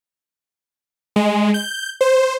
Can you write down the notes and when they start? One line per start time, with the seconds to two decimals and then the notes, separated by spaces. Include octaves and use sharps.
1.16 G#3
1.54 G6
2.01 C5